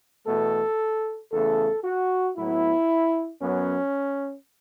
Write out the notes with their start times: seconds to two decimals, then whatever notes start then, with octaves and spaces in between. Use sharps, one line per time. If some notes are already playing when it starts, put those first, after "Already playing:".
0.27 E2 B2 A3 A4
1.32 E2 C#3 A3 A4
1.84 F#4
2.37 A2 F#3 B3 E4
3.42 F#2 F#3 B3 C#4